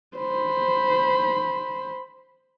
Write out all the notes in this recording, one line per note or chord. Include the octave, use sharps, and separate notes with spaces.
C5 B5